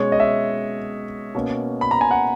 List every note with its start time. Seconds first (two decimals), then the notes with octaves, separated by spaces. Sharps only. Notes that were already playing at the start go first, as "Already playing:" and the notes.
Already playing: B2 G#3 C#4 C#5
0.12 D#5
0.20 E5
1.35 B2 A#3 C#4
1.81 B5
1.91 A#5
2.01 G#5
2.11 F#5